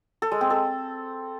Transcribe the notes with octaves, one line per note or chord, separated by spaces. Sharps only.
A4
G#3
C4
A4